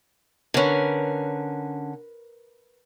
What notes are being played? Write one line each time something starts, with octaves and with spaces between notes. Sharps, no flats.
D3 C#4 A#4 B4